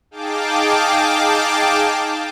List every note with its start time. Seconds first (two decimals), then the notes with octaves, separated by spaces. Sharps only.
0.11 D#4 G#4 F5 G5 A5 D6